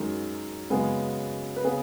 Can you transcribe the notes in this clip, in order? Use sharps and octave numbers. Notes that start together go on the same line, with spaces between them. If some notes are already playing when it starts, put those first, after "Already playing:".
Already playing: F#2 D#3 G#3
F#2 C#3 G#3 B3 G#4
B4
C#3 B3 G#4